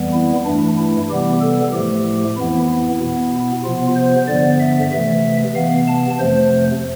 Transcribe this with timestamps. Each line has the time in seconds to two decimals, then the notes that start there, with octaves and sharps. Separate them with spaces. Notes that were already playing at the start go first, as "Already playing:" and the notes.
Already playing: F2 E3 G3 B3
0.13 E4
0.45 G2 E3 A3 D4
0.78 E4
1.09 C3 E3 G3 B3 G4
1.41 A4
1.73 A2 F3 A3 G4
2.37 F2 E3 B3 E4
2.68 E4
3.00 B2 B3
3.64 C3 F3 B3 F4
3.96 C5
4.28 G2 D3 F3 B3 D5
4.60 E5
4.92 C3 E3 A3 E5
5.55 C3 E3 B3 F5
5.87 A5
6.19 F2 C3 F3 A3 C5